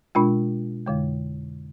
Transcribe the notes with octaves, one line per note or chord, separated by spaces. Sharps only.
B2 G#3 D4 F4
F2 D3 G#3